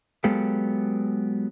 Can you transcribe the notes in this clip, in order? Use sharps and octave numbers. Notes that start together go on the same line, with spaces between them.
F#3 G#3 B3 G4 A4 F5